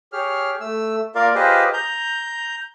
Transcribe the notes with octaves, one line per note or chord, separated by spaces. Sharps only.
G4 G#4 C#5 F6
A3 E6
A#3 F4 A#4 D5 F5
F4 G4 G#4 B4 C5 D#5
A#5 G6